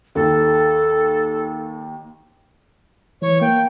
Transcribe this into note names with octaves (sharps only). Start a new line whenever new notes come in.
D#2 A4
E3 C#5
A#3 G5